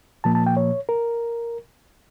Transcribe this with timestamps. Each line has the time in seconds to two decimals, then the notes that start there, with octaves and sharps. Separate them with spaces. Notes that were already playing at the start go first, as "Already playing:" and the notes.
0.24 A#2 F3 A#3 A5
0.35 A5
0.46 G5
0.57 C#5
0.89 A#4